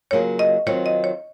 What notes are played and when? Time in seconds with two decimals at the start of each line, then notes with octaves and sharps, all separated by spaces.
0.11 C#3 F#3 A#3 F4 G#4 C#5
0.39 D#5
0.66 D#3 F#3 C4 F4 C#5
0.86 D#5
1.04 C#5